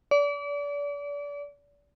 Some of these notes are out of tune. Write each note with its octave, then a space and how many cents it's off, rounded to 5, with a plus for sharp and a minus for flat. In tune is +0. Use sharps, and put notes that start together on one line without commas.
D5 -35